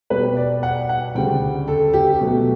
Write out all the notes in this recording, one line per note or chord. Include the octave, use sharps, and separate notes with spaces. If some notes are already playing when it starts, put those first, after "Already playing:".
B2 G3 B3 B4
D5
F#5
F#5
D2 C#3 G3 G5
A4
G4
B2 F#3 A3